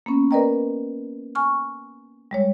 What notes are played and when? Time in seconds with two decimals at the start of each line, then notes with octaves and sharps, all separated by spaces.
0.06 A#3 B3 C#4
0.31 A#4 B4 D5 D#5 G5 A#5
1.35 G#5 C#6 F6
2.31 G3 G#3 C#5